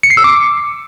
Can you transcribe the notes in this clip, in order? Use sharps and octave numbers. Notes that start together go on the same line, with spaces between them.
C#7
C7
E6
D6